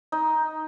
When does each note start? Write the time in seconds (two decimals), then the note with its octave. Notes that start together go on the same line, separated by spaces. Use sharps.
0.12 D#4